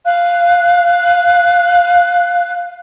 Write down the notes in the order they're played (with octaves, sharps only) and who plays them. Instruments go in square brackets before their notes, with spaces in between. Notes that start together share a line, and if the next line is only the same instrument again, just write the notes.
[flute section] F5 F#6